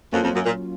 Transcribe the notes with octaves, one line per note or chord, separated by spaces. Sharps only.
F2 F#3 A#3 C#4 F4
F2
F#2
A#2